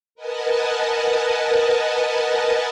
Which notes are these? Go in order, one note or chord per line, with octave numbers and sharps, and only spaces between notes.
A#4 B4 D#5 F#5 G#5 A5